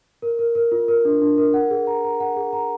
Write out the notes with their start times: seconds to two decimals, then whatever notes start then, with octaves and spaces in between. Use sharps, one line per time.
0.22 A#4
0.39 A#4
0.55 A#4
0.72 F4
0.88 A#4
1.05 D4
1.21 D4
1.38 A#4
1.54 F#5
1.71 G#4
1.87 A#5
2.04 A#5
2.20 F#5
2.37 G#4
2.53 A#5